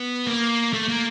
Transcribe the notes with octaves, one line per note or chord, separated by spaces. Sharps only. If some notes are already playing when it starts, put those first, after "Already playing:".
Already playing: B3
A#3
A3
A#3